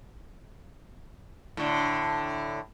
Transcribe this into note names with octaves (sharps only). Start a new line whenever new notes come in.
A2 D3